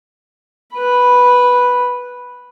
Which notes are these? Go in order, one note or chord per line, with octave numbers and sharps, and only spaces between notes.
B4 B5